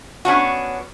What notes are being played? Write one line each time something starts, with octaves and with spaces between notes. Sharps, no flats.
B3 C#4 D4 F#4